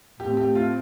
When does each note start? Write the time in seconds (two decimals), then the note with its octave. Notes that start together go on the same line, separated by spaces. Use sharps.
0.19 A2 A3 C4 G4
0.37 G4
0.55 F4